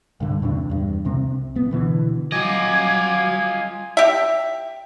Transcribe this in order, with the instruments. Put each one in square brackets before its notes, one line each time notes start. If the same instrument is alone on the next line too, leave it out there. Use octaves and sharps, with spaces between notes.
[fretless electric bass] C2 G2 D3
E2 A2 C3 D4
E2 G2
C2 C3 C4
D1 B3
B2 D3 E3
[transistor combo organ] F#3 D6 [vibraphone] G3 G#5 [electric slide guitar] F4 D#5 [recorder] G#6
[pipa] G4 E5